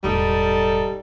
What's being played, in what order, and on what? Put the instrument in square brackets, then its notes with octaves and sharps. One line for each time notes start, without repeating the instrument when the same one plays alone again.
[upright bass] E1 A1 [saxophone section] G3 D#4 A4